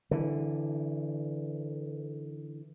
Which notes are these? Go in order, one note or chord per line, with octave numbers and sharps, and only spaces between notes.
D3 E3